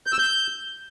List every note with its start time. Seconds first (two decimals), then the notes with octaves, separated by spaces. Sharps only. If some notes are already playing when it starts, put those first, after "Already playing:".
0.07 G6
0.13 E6
0.19 G6